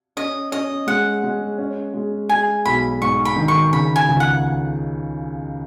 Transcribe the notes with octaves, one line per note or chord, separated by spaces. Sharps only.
C#4 D#5
C#4 D#5
G#3 F#5
G#3
C#4
G#3
G#3 G#5
B1 B5
G#2 C#6
B5
D#3
C#6
C#3 B5
G#5
C#2
F#5